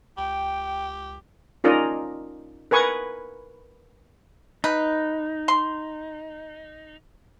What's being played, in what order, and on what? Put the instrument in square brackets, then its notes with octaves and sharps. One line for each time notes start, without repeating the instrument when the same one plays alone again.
[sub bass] C#2 [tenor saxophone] G4 [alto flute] G5
[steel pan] C#4 D#4 F4 A#4 D5 D#5
A#4 B4 G#5 C#6 D#6
[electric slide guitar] D#4 [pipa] B4
[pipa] C6